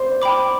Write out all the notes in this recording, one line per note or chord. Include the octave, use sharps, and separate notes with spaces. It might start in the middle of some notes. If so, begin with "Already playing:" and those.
Already playing: C5 D5 C6
G5 B5 D6